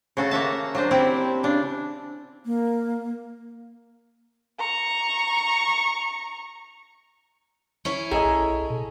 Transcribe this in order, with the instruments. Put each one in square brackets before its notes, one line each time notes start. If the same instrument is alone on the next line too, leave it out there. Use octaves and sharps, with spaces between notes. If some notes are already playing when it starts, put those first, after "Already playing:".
[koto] C#3 F#4 A4
A#3 F#4 E5 A5
F#3 D4 C5
C4 E4 G4
C#3 D4
[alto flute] A#3
[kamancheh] A#5 C#6
[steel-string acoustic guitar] C#4 E4 C#5
[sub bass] A#1 [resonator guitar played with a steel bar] G#4 A4 [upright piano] D#5 G#5 A#5
[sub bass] B1
B2